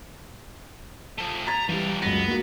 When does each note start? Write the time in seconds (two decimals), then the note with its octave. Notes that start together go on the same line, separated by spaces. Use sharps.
1.18 F3 A3
1.47 A#5 G#6 A6 B6
1.69 E3 F3 G3 G4
2.02 C#2 F#2 B3 A#6
2.28 A#3 F#4